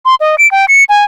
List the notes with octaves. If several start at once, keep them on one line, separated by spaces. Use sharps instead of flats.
C6
D#5
D7
G5
C#7
G#5